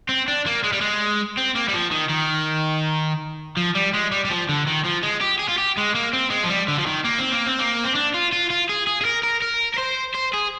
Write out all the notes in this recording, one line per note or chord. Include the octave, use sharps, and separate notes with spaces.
C4
D4
A#3
G#3
G3
G#3
C4
A#3
G3
F3
D#3
D#3
F3
G3
G#3
G3
G3
F3
D3
D#3
F3
G#3
G4
G#4
F4
G4
G#3
A#3
C4
G#3
F3
G3
D3
F3
D#3
A#3
C4
A#3
C4
A#3
C4
D4
F4
F4
F4
G#4
G#4
G#4
A#4
A#4
A#4
A#4
C5
C5
G#4